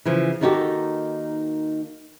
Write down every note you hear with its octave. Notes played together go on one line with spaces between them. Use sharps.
C#3 E3 F3
D#3 A#3 D#4 F#4 G4 A4